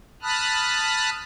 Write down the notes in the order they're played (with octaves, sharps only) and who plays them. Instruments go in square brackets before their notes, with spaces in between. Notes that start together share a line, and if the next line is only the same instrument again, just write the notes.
[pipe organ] A5 B5 D#6 F6 F#6